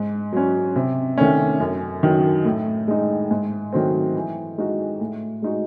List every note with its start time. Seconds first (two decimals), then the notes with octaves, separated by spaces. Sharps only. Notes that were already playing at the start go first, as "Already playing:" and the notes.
Already playing: G#2
0.33 F#3 C#4
0.76 C3
1.18 D#3 A3 C#4
1.60 F#2
2.03 D#3 F#3
2.45 A2
2.88 G#3 D#4
3.31 G#2
3.73 D#3 F#3 A3 C4
4.15 E3
4.58 G#3 D#4 F#4
5.00 A2
5.42 G#3 D#4 F#4